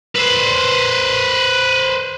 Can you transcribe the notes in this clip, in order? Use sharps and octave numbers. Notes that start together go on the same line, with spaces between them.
B4 C5